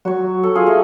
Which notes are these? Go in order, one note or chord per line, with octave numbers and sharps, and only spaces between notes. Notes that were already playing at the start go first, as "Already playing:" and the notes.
F#3 F#4 C#5
A4
C#4 F4 G#4
A3 D#5